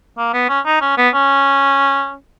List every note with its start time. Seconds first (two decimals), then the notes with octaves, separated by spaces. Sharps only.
0.18 A#3
0.33 B3
0.49 C#4
0.66 D#4
0.81 C#4
0.98 B3
1.14 C#4